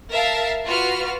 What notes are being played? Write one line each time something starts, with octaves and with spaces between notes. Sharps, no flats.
A#4 E5 F5 A5
F4 F#4 B4 F6